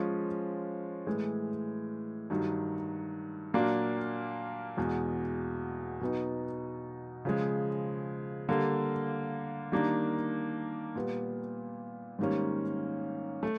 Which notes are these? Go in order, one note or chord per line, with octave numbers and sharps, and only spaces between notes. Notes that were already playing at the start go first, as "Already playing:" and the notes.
Already playing: F3 G#3 C#4 F4
A2 E3 G#3
G2 D#3 F#3
A#2 F#3 A#3 D4
E2 B2 G#3
B2 F#3 B3 D#4
C#3 F3 G#3
D3 G3 A#3
D#3 G3 A#3 D4
A#2 G3 B3
G#2 D#3 G3 A#3 C#4
A3